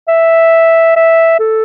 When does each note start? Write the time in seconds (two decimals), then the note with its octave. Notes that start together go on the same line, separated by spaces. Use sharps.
0.08 E5
0.96 E5
1.40 A4